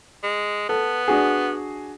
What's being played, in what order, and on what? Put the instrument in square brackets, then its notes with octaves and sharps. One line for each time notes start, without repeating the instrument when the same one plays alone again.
[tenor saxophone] G#3
[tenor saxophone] B3 [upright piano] A4
[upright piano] D4 F#4 G#4